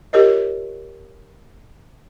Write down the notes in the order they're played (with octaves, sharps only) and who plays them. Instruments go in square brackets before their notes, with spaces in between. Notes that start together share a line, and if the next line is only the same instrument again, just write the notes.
[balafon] F4 G4 A#4 C#5 D#5